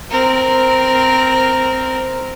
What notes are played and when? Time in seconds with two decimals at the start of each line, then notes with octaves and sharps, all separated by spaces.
0.11 C4 A#4